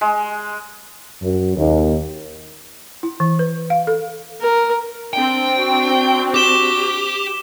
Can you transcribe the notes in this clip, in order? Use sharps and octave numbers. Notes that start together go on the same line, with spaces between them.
G#3
F#2
D#2
E4
E3
B4
F5
A4
A#4
C4 D4 G5
F#4
G4 D6 E7 G7